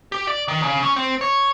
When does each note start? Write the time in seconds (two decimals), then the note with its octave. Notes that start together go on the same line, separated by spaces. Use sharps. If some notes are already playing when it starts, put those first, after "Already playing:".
0.12 G4
0.27 D5
0.48 D#3
0.63 C#3
0.83 C#4
0.96 C4
1.21 C#5